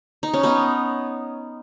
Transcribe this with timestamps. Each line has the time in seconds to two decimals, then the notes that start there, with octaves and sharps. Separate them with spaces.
0.23 D#4
0.33 C#4
0.43 B3 D#4